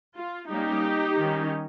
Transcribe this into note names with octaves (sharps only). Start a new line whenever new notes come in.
F4
G3 A#3 C#4 D#4 G4
D#3 G3 C#4